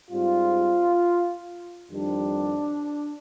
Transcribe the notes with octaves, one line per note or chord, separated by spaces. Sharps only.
G#2 G3 C4 F4
F2 D#3 G3 C4 D4